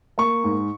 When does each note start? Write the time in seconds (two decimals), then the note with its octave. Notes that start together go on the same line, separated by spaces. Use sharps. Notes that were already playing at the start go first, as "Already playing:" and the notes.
0.18 A#3 C#6
0.44 G#2